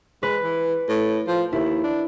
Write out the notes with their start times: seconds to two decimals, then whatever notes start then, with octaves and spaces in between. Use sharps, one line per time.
0.23 G#3 B4
0.44 E3
0.89 A2
1.27 F3
1.53 D#2 E4
1.84 D4